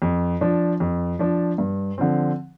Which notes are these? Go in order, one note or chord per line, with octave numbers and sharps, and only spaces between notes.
F2
F3 D4
F2
F3 D4
G2
D3 F3 C4